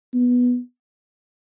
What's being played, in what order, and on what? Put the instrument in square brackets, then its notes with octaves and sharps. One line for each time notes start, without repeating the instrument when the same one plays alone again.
[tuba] B3